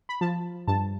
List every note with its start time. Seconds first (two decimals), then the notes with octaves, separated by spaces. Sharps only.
0.09 B5
0.21 F3 A5
0.68 G2 A5